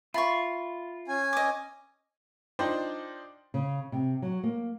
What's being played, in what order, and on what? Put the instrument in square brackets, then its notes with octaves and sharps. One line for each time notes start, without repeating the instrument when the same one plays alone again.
[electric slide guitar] F4 [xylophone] E5 A6 [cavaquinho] B5 C#6
[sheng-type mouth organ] C#4 G#5
[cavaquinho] D#5 D6
[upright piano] D4 D#4 F4 C5 D5 G5
[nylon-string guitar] C#3
C3
F#3
A#3